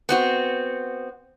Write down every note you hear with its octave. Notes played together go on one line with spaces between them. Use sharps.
B3 C4 F#4